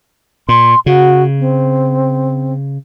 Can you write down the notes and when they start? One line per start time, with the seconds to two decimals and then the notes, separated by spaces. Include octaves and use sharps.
0.49 A#2 C6
0.86 C#3 F#4
1.39 C4